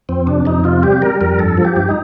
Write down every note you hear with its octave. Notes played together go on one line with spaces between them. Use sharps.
F2 C4
C3 D4
F2 D#4
C3 F4
G3 G4
G3 A#4
F2 A#4
G2 A4
F3
G4
G2
D#4